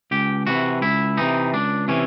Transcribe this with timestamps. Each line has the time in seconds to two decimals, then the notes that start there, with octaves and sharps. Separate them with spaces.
0.11 C#2 G4
0.47 C3 E3 F#4
0.82 C#2 E4
1.17 C3 E3 D#4
1.53 C#2 D4
1.88 C3 E3 C#4